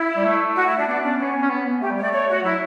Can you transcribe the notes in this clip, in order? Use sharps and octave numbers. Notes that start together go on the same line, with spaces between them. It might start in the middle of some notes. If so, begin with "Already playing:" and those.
Already playing: E4
G3
A3
F#4
E4
D4
B3 D4
C#4 D4
B3 C#4
C#4
B3
B3
A3 G4
G3
C#5
A3 D5
C#5
F#4
F#3 E4